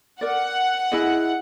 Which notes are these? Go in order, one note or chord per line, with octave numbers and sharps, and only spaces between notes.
A#4 D5 F#5
E4 G#4 D#5